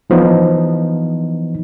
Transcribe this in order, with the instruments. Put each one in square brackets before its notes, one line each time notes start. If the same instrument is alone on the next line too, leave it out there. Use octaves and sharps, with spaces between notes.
[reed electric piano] E3 F3 B3 D#4